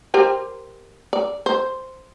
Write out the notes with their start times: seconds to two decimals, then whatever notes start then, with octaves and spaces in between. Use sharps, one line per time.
0.14 G4 A#4 C5
1.13 D5
1.46 C5